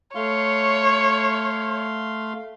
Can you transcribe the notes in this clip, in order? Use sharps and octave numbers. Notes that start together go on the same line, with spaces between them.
A3 C#5 F5 C6